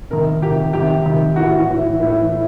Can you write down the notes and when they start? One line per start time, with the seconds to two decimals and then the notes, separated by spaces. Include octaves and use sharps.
0.10 C3 D#3 A#4
0.42 C3 D#3 G4
0.73 C3 D#3 G4
1.05 C3 D#3
1.36 A2 E3 F#4
1.69 A2 E3
2.00 A2 E3
2.32 A2